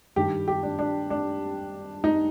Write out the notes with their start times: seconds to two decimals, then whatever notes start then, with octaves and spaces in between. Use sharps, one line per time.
0.16 G2 D#3 G3 G4
0.48 G4
0.63 D4
0.79 D4
1.10 D4
2.04 D#4